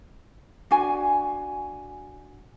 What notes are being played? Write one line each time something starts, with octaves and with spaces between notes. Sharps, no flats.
D4 F#4 G#5